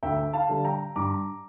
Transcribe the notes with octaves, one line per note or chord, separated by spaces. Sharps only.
D2 E5 G5
F5 A5
D3 G3
G5 A#5
G2 A#5 D6